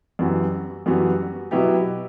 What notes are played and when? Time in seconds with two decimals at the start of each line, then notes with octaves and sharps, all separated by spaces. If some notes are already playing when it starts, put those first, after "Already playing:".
0.19 F#2 E3 G3 B3 F#4
0.86 F#2 E3 G3 B3 F#4
1.51 B2 F#3 B3 E4 G4